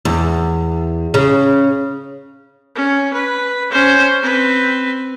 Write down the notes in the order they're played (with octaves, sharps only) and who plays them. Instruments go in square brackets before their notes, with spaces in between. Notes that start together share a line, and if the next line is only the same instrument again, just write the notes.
[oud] E2
C#3
[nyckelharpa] C#4
B4
C#4 C5
C4 B4